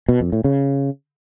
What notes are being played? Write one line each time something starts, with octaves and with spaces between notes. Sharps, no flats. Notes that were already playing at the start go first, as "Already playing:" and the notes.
B2
F2
A2
C#3